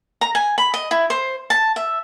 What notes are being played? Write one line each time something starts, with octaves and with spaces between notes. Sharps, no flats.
A#5
G#5
B5
D#5
E4
C5
A5
E5